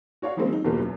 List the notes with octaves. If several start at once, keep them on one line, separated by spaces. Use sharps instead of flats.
F#4 C#5 D5 F5
D#3 F3 G3 G#3 A#3 C4
F#3 D#4
G1 E2 B2 A#3 F4 G4
F#2